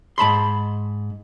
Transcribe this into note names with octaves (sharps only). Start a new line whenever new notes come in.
G#2 A5 B5 C6